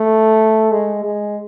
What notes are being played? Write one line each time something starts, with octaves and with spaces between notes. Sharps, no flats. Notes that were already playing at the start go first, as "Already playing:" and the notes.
Already playing: A3
G#3
G#3